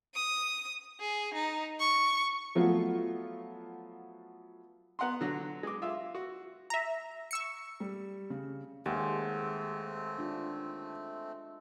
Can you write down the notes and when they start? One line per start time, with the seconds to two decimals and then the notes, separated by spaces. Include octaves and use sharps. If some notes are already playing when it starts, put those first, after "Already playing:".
0.15 D#6
1.00 G#4
1.34 D#4
1.80 C#6
2.55 F3 F#3 A3 B3 F4
4.99 B3 F#5 A#5 C6
5.21 D3 F#3
5.63 G#3 D6
5.82 F4 E5 F5 E6
6.15 F#4
6.70 E5 A#5
7.31 C#6 E6 C#7
7.80 G3
8.30 C#3
8.86 D#2 G#3 A3 C4 G4 F#5
10.18 D4 F4